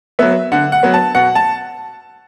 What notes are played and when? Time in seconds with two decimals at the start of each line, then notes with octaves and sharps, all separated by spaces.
0.19 F#3 B3 E5
0.52 D3 F#5
0.72 F#5
0.83 F#3 B3
0.94 A5
1.15 B2 F#5
1.35 A5